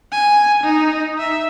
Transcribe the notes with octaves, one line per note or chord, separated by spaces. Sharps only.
G#5
D#4
E5